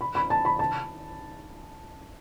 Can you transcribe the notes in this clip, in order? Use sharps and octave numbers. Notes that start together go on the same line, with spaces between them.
B5
B5
A5
B5
A5